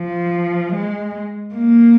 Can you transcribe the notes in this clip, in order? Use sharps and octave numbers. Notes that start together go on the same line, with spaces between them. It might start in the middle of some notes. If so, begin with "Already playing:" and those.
Already playing: F3
G#3
A#3